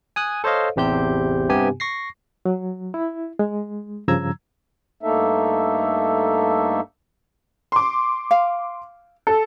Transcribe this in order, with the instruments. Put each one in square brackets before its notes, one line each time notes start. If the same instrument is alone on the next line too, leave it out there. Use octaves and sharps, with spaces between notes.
[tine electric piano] G#5 D#6 F#6
A4 C5 C#5 D#5 F5
A1 E2 C3 G4 C5 G6
G2 C3 B3 G4 G#5
C#6 A#6 C7
[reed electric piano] F#3
E4
G#3
G2 C#3 F3 A#5 E6 G#6
[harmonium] G2 A3 A#3 D#4 A4 E5
[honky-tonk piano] C6 D6
[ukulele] F5
[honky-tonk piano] A4